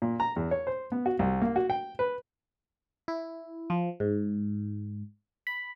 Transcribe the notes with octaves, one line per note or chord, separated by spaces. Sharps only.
A#2
A#5
E2
C#5
C5
B3
F#4
C2
A#3
F#4
G5
B4
E4
F3
G#2
B5